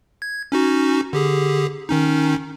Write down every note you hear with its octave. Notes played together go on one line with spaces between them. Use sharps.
G#6
C#4 D#4 F#4
D3 G4 G#4
D#3 C#4 D#4